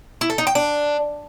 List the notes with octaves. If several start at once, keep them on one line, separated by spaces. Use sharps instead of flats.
E4
A4
D#4
G5
D4